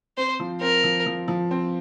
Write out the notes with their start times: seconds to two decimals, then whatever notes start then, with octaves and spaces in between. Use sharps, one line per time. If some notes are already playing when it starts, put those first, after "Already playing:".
0.17 C4 C5
0.40 F3
0.61 C4 A#4
0.84 F3
1.06 F3
1.28 F3
1.51 C4